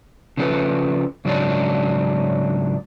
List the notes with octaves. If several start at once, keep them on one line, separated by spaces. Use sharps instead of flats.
C#3 F3 A#3 C#4 A4 B4
G#2 C#3 F#3 G#3 D4 D#4